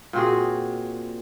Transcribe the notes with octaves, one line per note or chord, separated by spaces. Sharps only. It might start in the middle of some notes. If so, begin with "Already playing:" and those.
A#2 C4 F#4 G#4